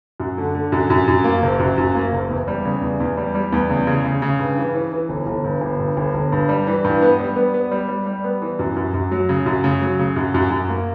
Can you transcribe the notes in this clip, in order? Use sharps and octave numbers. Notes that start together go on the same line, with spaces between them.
F#2
D3
D3
F#2
F#2
F#2
A#3
F#1
F#2
F#2
A#3
F#1
E2
G3
C#3
E2
E2
G3
G3
E2
C#3
C#3
C#3
C#3
G2
E3
E3
E3
G1
G1
G2
G1
G2
G1
G1
G2
G3
E3
G2
B3
G3
B3
B3
G3
G3
G3
B3
E3
F#2
F#2
F#2
F#3
C#3
F#2
C#3
F#3
C#3
F#2
F#2
F#2
A#3